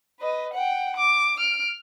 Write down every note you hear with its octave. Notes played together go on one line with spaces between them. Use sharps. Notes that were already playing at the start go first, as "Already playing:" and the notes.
B4 D#5
F#5 G5
D6
F6 D7